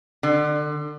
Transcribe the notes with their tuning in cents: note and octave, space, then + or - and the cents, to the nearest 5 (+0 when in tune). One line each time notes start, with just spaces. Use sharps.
D3 +30